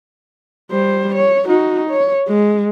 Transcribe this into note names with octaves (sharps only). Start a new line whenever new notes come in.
G3 C5
C#5
D#4 F#4
C#5
G#3